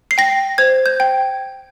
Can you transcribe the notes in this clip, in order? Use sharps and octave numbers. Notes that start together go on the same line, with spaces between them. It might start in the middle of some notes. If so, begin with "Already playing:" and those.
C7
G5 A#6
C5 G#6
G6
G5